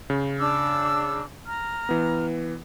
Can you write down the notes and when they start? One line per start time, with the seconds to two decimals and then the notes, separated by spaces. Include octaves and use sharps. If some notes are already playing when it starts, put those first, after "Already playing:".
0.10 C#3
0.40 D4 D6 E6
1.46 A#5 F6
1.89 E3 B3